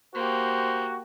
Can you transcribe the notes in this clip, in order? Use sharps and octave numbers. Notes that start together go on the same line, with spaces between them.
A#3 F#4 G4 C5